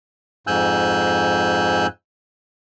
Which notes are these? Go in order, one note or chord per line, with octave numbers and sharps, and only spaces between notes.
F2 G#2 G#5 E6 F#6 G6